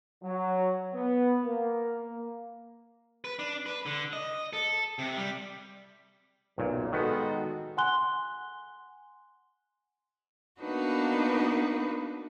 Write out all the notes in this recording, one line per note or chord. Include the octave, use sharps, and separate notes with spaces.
F#3
B3
A#3
B4
D4
B4
D3
D#5
A4
C3
G3
B1 F#2 A#2
D#3 G#3 B3 F#4 A4
F#5 G#5 C6 F#6 G7
A#3 B3 D4 D#4 F#4 B4